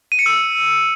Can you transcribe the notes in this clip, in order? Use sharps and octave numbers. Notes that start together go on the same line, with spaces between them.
D#7
C#7
E6